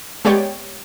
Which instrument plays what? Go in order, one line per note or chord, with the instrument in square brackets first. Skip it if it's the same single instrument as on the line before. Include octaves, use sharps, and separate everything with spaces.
[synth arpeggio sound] G#3 B3 G4 C#5 D5 G5